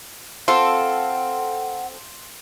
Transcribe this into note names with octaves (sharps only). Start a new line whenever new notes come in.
C4 F4 A4 F#5